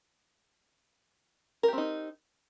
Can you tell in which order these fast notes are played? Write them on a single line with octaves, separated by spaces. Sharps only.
A#4 G4 C4 D#4